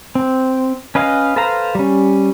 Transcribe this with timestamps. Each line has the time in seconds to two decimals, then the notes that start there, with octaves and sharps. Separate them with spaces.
0.15 C4
0.95 C#4 B4 D#5 F5
1.36 A4 B4 C5 F5 A#5
1.75 G3 C#4